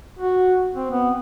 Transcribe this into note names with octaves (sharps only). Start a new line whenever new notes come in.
F#4
C4
B3